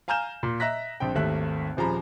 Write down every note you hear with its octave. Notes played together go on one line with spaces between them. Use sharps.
F5 G#5 A#5 F6 G6 E7
A#2
D#5 E5 A#5 F#6 A#6 B6
A#1 C4 G5
G#1 D#2 A3 E5 F#6
D#1 F3 G#4 A#5 B5